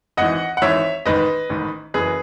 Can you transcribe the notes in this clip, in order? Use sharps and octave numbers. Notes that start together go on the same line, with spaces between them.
G#1 G#2 E3 D#5 F#5
F#5
G#1 G#2 E3 C#5 E5
A1 G#2 D#3 B4 D#5
A1 G#2 D#3
F#1 F#2 E3 G#4 B4